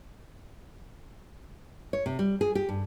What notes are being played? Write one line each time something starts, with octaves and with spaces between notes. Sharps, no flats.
C#5
C3
G3
G#4
G4
G2